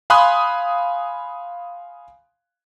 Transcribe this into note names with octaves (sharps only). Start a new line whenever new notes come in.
F5 G#5 B5 C6 D#6 F#6